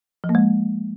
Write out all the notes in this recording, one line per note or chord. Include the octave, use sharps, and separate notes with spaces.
F3
A#3
G#3